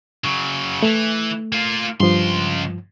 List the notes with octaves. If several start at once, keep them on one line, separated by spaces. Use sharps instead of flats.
C#3 F#3
E3 A3
A#3 F4
C#2 G2 F3 C6